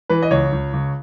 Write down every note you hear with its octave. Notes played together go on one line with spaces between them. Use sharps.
E3 B4
D#5
C#2 C#5
C#2
C#2